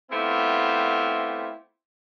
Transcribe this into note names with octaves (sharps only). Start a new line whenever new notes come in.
A3 B3 C4 E4 F4 G4